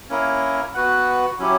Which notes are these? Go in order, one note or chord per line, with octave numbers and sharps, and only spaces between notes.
A#3 C#4 E4 A#4
B3 F#4 B4 F#5
F#3 C#4 E4 G4